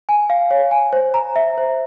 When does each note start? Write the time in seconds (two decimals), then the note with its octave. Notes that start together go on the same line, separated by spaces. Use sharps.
0.09 G#5
0.30 F5
0.51 C#5
0.71 G#5
0.93 C5
1.14 A#5
1.36 E5
1.58 C5